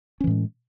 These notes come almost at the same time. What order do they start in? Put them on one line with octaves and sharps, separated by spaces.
C#4 E3 A2 G#3